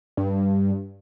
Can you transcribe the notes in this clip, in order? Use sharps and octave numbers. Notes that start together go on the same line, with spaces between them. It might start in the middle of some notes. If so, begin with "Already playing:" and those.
G2